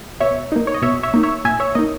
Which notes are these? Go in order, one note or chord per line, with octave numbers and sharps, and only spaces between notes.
B2 C#5 E5
A#3 D#4
C#5
D#5
B2 C#5 E5
C#5 E5
A#3 D#4
C#5 E5
A#2 E5 G#5
C#5 E5
A#3 D#4 D#5